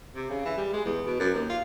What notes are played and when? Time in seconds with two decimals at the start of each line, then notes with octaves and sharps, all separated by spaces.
0.15 C3
0.29 C#3
0.45 E3
0.57 G3
0.73 G#3
0.85 E2
1.06 B2
1.19 F#2
1.35 D#2
1.49 F4